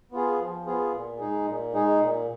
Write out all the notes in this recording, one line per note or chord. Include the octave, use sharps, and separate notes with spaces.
B3 F4 G#4
F3
B3 F4 G#4
A#2
G#3 D#4 G#4
A#2
G#3 D#4 G#4
A#2